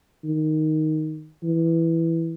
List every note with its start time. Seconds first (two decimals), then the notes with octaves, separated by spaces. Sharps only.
0.24 D#3
1.44 E3